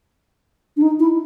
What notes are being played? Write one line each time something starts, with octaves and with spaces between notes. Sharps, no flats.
D4
D#4
E4